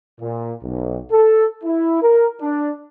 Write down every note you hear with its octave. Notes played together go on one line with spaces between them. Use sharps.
A#2
B1
A4
E4
A#4
D4